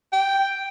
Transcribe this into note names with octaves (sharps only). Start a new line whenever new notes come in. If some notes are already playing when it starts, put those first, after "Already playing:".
G5